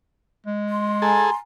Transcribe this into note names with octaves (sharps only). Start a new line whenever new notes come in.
G#3
C6
G#4 A4 G#5 A#5